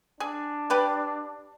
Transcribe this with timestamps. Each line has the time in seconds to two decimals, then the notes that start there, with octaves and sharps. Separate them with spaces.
0.20 D4 G#4
0.70 G4 B4 D5